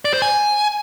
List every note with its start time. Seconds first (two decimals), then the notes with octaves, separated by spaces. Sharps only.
0.05 D5
0.13 C5
0.22 G#5